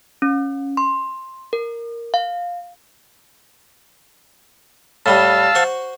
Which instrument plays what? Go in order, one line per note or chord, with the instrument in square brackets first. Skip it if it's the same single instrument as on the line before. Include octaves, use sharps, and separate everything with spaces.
[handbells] C#4
C6
A#4
F5
[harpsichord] A2 G3 [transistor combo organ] F5 A5 E6
[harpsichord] F#4 C5 C#6